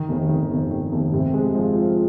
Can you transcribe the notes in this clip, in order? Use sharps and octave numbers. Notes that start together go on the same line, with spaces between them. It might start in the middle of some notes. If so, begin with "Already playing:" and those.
Already playing: D#3
F1
D#3
F1
D#3
F1
C3
G#3
F3
F4